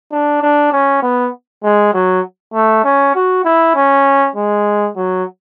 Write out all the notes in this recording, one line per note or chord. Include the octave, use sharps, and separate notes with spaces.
D4
D4
C#4
B3
G#3
F#3
A3
C#4
F#4
E4
C#4
G#3
F#3